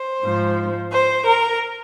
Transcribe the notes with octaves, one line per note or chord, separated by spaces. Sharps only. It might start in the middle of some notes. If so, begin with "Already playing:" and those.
Already playing: C5
G#2 F3
C5
A#4